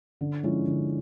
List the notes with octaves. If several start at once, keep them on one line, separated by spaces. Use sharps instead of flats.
D3
F3 G#3 C#4 E4
D3